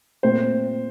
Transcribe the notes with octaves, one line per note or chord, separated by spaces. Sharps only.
A#2 A3 C4 C5